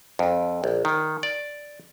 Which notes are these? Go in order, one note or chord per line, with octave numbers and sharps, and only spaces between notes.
F2
A#1
D#3
D5